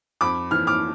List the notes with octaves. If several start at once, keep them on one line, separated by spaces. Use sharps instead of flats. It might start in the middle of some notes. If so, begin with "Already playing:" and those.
F2 B5 D6
E3 F6
D6 F6